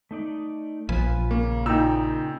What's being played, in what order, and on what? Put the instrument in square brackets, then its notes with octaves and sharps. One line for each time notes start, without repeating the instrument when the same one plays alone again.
[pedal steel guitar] A3 D#4 D5
[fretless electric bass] A#1 F3 [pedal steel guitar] F4 B4 G#5
[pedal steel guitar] C#3 C#4 [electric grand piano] A#3
[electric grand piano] A#2 G5 [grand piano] D#4 E6